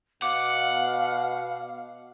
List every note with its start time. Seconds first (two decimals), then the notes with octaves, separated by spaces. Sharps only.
0.22 B2 F5 F#5 D6